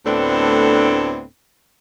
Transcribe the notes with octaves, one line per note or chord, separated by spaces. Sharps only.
D2 A2 B3 C4 D4 A4